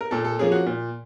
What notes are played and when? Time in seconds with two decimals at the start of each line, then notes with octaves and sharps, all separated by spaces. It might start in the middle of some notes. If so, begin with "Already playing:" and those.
0.01 A#4
0.11 A#2 A4
0.25 A4
0.39 F3 A#3 C#4 G#4
0.52 F#4
0.66 A#2